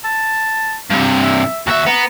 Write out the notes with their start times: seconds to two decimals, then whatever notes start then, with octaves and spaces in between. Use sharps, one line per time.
0.05 A5
0.90 G2 C3
1.21 E5
1.67 D#2 F#4 E5
1.86 B3 A#5